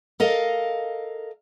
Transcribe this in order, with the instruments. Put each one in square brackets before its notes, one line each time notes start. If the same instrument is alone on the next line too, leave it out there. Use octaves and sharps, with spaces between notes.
[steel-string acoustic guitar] A4 A#4 D#5 F5